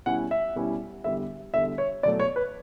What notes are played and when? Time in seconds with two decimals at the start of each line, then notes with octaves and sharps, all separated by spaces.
0.06 B2 G3 C#4 E4 F#5
0.31 E5
0.55 B2 G3 C#4 E4
1.04 E2 D3 G3 E5
1.54 E2 D3 G3 E5
1.78 C#5
2.03 E2 B2 F#3 A3 D5
2.20 C#5
2.36 B4